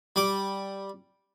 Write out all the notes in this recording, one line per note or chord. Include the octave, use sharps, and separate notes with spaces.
G3 D6